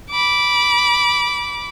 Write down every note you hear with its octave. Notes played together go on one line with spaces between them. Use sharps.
B5 D6